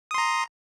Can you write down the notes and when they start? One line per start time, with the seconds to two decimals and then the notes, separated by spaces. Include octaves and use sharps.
0.11 D#6
0.14 C6
0.18 A#5